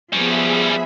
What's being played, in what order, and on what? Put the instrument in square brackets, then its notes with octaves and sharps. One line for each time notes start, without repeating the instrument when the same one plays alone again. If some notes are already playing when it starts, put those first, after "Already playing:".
[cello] F3 B3 [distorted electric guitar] G3 C#4 [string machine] G#4 E5 B5